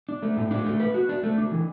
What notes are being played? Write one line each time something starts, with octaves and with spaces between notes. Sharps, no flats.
D4
A3
A2
D4
A3
B4
F#4
D4
A3
D4
E3